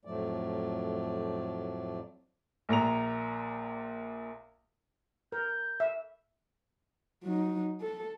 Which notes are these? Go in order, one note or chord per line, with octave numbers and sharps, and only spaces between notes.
F2 A2 F3 F#3 A3 D5
A#1 A#2 A#5 F7
A#4 G6
E5
F#3 D#4
A4